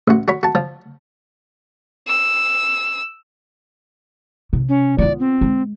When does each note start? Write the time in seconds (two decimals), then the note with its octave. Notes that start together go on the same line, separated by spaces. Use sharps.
0.08 A1 F#4
0.28 F#4 C#5 B5
0.43 F#4 A5
0.55 F3
2.07 E6
4.53 C3
4.69 C#4
4.98 B3 F4 D5
5.20 C4
5.41 G#3